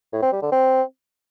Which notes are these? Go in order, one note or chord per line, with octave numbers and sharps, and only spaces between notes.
A2
C4
G3
D3
C4